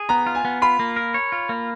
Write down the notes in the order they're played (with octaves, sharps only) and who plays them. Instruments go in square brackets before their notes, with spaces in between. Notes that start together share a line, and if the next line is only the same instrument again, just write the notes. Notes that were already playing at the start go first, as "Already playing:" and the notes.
Already playing: [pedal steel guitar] G#4
[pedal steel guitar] B3 [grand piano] A#5
[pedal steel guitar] F4
[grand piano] G#5
[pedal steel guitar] B3
[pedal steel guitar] F4 [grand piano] B5
[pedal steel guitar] A#3
A#4
C#5
F4
A#3